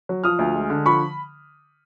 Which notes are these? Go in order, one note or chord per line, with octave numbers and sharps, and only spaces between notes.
F#3
F3 D#6 F6
D2
G#3
D3
F3 B5 C#6